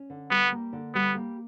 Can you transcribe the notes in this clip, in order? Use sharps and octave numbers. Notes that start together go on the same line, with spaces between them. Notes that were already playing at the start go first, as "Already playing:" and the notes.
Already playing: C#4
D3
G3 B3
A#3
D3
G3 B3
A#3